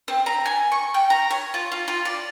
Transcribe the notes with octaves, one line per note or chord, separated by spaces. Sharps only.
C4
A#5
G#5
C#6
G5
A#5
C#5
F4
F4
F4
D5